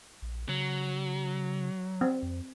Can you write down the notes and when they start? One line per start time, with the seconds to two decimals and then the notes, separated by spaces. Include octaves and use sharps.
0.22 A#1
0.49 C#3 F#3
2.01 C4
2.22 F2